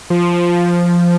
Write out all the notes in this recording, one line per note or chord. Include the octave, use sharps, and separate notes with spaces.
F3